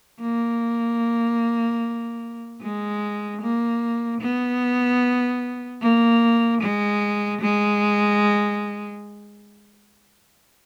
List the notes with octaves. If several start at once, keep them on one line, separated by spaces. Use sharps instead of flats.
A#3
G#3
A#3
B3
A#3
G#3
G#3